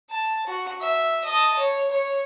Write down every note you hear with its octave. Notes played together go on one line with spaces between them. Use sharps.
A5
F#4
E5
D#5 A5
C#5
C#5